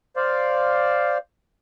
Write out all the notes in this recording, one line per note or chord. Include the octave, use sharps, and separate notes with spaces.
C5 D5 F5